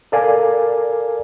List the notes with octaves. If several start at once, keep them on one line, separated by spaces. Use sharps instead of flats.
A4 A#4 D5 F5 G#5